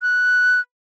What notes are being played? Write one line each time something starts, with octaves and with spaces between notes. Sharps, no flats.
F#6